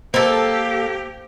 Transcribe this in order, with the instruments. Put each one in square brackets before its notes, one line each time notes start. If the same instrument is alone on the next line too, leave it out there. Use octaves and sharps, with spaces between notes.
[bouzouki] A#3 A4 [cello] G4 [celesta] C5